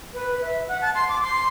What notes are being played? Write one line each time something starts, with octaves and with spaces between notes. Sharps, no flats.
B4
E5
F#5
A5
C6
D6
C6